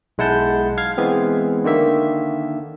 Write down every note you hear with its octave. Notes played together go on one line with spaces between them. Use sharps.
B1 G#3 E4 F#5 A5 G6
F5 G#6
E3 G#3 B3 C4
D3 D#3 A#3 E5